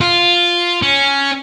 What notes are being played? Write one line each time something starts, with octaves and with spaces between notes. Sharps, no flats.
F4
C#4